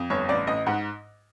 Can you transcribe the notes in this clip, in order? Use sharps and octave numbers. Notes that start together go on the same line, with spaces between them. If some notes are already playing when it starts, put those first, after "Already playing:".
Already playing: F2
G1 C#5
A1 D5
A1 D#5
G#2 F#5